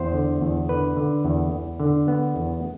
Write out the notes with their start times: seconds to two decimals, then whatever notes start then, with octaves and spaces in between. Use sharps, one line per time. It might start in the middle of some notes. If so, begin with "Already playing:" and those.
Already playing: E2 C5
0.13 D3
0.41 E2
0.69 D3 B4
0.97 D3
1.24 E2
1.52 E2
1.80 D3
2.08 B3
2.36 E2